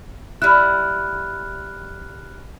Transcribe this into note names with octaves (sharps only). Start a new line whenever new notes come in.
G3 E4 F6 F#6